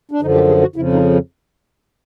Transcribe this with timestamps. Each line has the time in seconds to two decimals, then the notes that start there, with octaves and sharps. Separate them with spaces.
0.11 D4
0.21 F#2 D3 F3 D#4
0.34 G4
0.48 G#4
0.61 F#4
0.76 F2 C#3 F3 E4
0.93 D#4